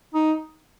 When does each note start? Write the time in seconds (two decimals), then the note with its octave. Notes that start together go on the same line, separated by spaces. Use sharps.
0.14 D#4